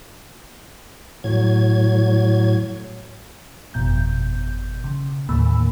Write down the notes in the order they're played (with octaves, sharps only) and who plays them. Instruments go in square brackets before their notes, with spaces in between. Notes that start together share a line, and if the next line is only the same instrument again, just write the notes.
[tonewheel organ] A2 F#3 G#6
[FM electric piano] G1 F2 B2 G6
C#3
D#2 A2 D3 A#3 B5 E6